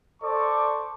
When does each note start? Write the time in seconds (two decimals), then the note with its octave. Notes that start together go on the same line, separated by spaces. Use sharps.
0.22 A4 C5 D5 A5 C#6 D6